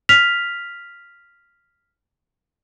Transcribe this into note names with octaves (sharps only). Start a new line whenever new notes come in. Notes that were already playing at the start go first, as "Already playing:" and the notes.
F6 B6 F7